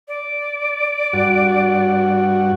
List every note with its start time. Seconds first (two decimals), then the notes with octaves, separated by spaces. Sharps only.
0.08 D5
1.13 G2 F#4